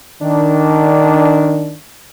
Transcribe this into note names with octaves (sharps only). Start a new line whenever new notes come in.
D#3 D4